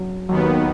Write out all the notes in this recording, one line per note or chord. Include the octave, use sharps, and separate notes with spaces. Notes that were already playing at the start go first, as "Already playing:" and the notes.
Already playing: F#3
D#2 D#3 F#3 B3